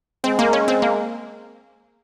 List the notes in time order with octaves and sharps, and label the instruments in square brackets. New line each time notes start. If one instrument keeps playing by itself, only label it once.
[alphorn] G#3 [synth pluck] C4
[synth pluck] A#3
C#4
C4
A#3